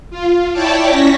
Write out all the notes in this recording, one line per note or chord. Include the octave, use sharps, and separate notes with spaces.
F4
E4 C#5 D5 G5 A5 D6
C#4 C#6 A#6 B6